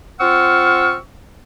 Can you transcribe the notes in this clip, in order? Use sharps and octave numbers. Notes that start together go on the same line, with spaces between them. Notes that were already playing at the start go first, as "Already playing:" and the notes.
C4 F4 F#5 C#6 E6 F6